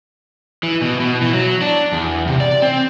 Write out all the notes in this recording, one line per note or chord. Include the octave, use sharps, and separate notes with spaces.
E3
B2
B2
E3
F#3
D4
E2
C3
D5
C4